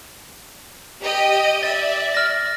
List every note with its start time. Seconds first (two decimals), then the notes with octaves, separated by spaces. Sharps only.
1.04 G4 D#5 G5
1.63 D5 E5 A6
2.14 F6 A#6